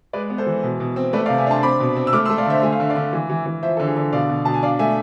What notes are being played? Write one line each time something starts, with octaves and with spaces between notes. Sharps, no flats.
G#3 B4 D5
B3
A4 C5
E3
B2
B2
C4
A3 B4 D5
D5 F5
C3
E5 G#5
D4 A5 C6
C4 B5 D6
B2
C4
E6
A3 D6 F6
C6 E6
A3
D5 F5
D3 C5 E5
A3 G#5
F5
D3 E5
D5 F5
D3
E3
E3
E3
F3 C5 E5
D3 A4
G#4
D3
B2 D5 F5
B2
B2 A5
G#5
D4 D5 F5
A3 E5 G#5